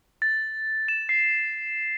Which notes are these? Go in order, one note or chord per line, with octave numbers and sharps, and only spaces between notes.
A6
E7
C7